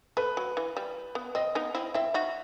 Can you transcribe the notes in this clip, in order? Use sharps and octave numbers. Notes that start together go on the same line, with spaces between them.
A3 B4
F#3
E3
G3
B3
C4 D#5
B3 D#4
C4 E4
C4 E4 E5
D#4 F#4